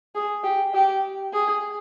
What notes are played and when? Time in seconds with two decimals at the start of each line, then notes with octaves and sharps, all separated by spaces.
0.15 G#4
0.44 G4
0.74 G4
1.33 G#4